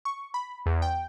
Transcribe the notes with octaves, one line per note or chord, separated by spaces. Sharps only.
C#6
B5
E2
G5